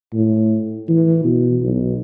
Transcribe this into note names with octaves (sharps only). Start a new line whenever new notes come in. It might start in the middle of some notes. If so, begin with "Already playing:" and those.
A2
E3
B2
B1